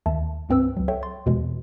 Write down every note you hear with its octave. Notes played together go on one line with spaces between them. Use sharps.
D#2 D#3 E5 A5
C#2 G2 C4 B4 E6
C#2 F#3
A4 C#5 E5 G5
C6 A6
E2 B2 E3 G#3